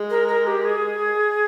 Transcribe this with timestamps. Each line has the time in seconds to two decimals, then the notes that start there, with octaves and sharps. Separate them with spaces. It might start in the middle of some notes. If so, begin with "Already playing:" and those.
Already playing: G#3
0.11 A#4
0.28 A#4
0.47 G4
0.65 G#4